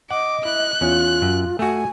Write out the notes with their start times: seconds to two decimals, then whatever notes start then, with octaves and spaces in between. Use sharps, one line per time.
0.11 D#5 F#5 D6
0.45 E4 F#6
0.81 E2 C#4 F4
1.22 F#2
1.59 A3 F#4 G#5